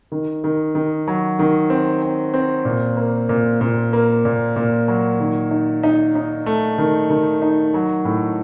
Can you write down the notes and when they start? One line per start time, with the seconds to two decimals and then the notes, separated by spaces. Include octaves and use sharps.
0.12 D#3
0.44 D#3
0.75 D#3
1.08 F#3
1.39 D#3
1.70 C4
2.02 C4
2.34 C4
2.65 A#2
2.97 A#3
3.29 A#2
3.61 A#2
3.93 A#3
4.25 A#2
4.56 A#2
4.88 F#3
5.20 D#3
5.51 D#4
5.83 D#4
6.15 D#4
6.46 A3
6.78 D#3
7.10 D#3
7.42 D#4
7.74 F#3
8.05 A2